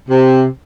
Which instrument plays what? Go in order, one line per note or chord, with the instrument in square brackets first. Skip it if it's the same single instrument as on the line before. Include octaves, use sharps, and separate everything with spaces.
[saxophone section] C3